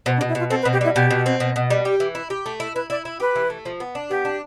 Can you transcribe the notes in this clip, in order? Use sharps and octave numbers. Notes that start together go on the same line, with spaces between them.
B2 C5
D4
B2
E4
B2 F4
C4 A4
B4
B2
G4
G3 E4
B2 G4
B2
C4
B2
B2
G3
G4
E3
E4
G4
A3
E4
E4 B4
E4 D5
E4
G4 B4
E3
A3
F3
B3
D4
B3 G4
D4